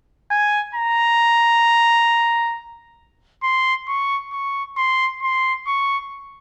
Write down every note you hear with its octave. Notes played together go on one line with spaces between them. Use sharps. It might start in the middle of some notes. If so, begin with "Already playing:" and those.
G#5
A#5
C6
C#6
C#6
C6
C6
C#6